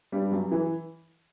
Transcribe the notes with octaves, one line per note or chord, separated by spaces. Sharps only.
G2 G3
F#2 F#3
E3